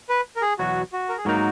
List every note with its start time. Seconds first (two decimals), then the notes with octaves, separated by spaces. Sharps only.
0.09 B4
0.36 A#4
0.42 G#4
0.59 E2 B2 F#3 F#4
0.93 F#4
1.09 A#4
1.18 G#4
1.25 G#2 F#3 A#3 D#4 F#4 A#4